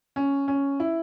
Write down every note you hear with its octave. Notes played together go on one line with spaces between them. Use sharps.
C#4
C#4
E4